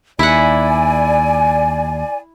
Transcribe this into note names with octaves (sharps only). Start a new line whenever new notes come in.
D#2 E4 D5 F#5 G#5